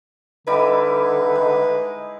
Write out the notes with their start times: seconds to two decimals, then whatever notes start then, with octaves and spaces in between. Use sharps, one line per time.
0.47 D3 G3 D#4 E4 B4
1.35 G#3